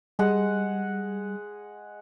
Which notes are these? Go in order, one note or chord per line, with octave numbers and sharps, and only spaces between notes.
G3 G#3 G#4 F#5